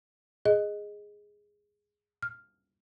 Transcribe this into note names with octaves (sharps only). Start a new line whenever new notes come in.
G#4 D#5
F6